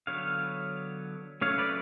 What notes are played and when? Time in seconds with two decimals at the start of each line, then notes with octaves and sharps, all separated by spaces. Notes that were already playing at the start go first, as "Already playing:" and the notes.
0.07 D3 F#3 B3 C#5 F5
1.41 F#3 A3 C#4 C#5 F5
1.58 B4 D5